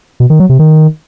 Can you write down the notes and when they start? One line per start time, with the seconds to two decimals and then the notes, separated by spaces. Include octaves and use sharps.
0.20 B2
0.30 D#3
0.40 F#3
0.49 C3
0.59 D#3